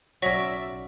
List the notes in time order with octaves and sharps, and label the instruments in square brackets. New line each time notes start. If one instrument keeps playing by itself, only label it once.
[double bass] B1 [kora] F#3 C#4 [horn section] D5 E5 [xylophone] C#6 A#6 B6